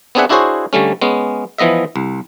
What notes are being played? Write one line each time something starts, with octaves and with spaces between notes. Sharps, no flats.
B3 C4 D4 G#4 E5 F#5
D4 E4 F#4 G#4 C5 C#5
D3 G3 A3 C#4
G#3 B3 C#4
E3 F3 B3 D#5 E5
C2